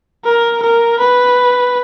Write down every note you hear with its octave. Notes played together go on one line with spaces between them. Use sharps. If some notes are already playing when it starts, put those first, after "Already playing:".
A#4
A#4
B4